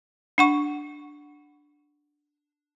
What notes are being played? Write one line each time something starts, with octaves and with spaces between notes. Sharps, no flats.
D4 F#5 C#6